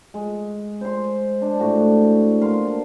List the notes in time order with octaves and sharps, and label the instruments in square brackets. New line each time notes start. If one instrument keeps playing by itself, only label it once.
[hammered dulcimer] G#3
C5 C6
D4
A2 F#4 D6
A#3 F5 C6
A5